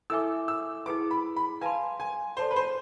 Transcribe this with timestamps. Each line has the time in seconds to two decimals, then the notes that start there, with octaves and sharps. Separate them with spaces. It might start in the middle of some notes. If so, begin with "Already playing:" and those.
0.10 E4 A4 E5 G#5 D6 E6
0.48 E6
0.86 E4 G#4 B4 D6
1.11 B5
1.36 B5
1.61 B4 F5 G#5 A5 C6
2.00 G#5
2.37 A4 C5 D5 A5 C6
2.51 B4
2.56 C5